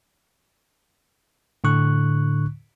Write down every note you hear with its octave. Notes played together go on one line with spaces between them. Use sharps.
A2 D3 C#6 F#6